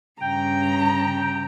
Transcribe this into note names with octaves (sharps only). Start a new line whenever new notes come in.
G2 C#3 G5 A#5